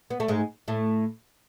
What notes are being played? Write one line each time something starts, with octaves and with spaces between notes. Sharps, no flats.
B3
A3
G#2 G#3
A2 A3